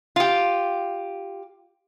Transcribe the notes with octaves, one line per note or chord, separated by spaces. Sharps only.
F4 G4